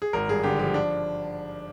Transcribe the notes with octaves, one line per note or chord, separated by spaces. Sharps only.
G#4
G#1 A#4
G2 G#4
D3 G4
F3 G4
D4